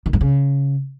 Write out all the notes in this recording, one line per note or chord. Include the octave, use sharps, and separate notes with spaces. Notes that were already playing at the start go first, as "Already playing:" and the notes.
D#3
G2
C#3